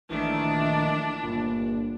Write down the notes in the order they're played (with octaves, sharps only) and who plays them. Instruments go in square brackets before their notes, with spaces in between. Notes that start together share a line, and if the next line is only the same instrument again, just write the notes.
[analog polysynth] A#1 D#3 A3 [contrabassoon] E3 [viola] D4
[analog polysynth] G1 [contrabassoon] A#2